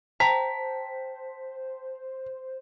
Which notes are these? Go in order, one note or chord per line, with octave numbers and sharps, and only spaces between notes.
C5 G5 A5 A#5 B6